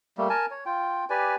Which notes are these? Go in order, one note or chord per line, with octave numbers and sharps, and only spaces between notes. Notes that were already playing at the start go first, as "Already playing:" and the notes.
G3 A3 A#3
A#4 G#5 A5
C#5
F4 G5
G4 B4 D5 G#5